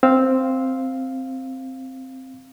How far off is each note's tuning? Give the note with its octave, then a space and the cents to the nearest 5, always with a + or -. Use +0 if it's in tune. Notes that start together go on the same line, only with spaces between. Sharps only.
C4 +0 F5 +0 E6 -15